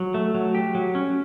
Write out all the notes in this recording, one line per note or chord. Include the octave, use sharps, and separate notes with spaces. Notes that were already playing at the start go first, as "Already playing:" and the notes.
Already playing: F#3
A3
F#3
G4
F#3
C#4